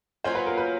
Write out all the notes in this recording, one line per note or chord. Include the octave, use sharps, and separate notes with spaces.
F#3 A#3 C#4 F4 C5
B4
A#4
B4